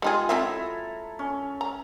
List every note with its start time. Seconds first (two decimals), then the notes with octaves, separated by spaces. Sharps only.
0.02 G3 G#3 D#4 F4 G#4
0.29 F#3 C4 E4 A4 E5 A#5
1.19 C#4
1.61 A#5